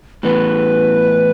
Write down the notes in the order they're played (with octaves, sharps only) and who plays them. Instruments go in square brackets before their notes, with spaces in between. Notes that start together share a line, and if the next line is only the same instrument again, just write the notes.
[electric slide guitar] A2 E3 B3 [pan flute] B4